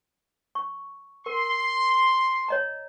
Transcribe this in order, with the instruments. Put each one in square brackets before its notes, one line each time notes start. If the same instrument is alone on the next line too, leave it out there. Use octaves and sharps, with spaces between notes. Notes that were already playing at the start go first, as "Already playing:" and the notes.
[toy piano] C#6
[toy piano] A#4 [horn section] C6
[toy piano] C#5 D#5 A#5